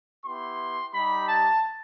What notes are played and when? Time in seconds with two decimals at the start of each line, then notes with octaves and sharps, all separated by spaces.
0.25 B3 E4 G4 C6
0.94 G3 D#4 G4 B5
1.28 A5